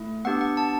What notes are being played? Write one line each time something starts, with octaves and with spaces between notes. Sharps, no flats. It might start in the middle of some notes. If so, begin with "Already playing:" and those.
Already playing: A3 E4
B3 D4 G4 F#5
F#5
A5